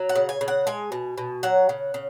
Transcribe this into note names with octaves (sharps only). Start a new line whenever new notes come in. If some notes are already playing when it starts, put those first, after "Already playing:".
Already playing: F#3
F#5
C#3
G#5
C#3
F#5
G#3 G#5
B2
B2
F#3 F#5
C#3
C#3